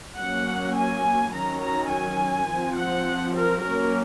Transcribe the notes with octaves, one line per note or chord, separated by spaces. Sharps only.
F#3 A#3 C#4 F#5
G#5
D#3 F#3 C#4 A#5
A#5
G#5
F3 C4
F#5
A#4
F#3 A#3 C#4 A#4